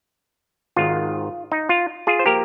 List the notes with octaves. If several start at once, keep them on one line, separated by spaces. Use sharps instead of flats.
G#1 G#2 D#3 F4
D#4
F4
F4 G#4
C5
F3 A#3 G4 A#4